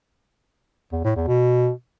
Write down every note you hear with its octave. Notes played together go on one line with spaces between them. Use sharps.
E2
A2
E2
B2